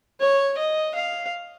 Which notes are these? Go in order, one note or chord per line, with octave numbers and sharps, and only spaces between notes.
C#5
D#5
F5